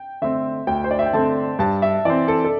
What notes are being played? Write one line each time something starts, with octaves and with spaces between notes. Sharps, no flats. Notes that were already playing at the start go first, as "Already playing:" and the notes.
Already playing: G5
D3 A3 C4 E5
D2 G5
C5
D5
E5
G5
D3 A3 C4 A5
G2 A5
E5
E3 C4 D5
A4
A4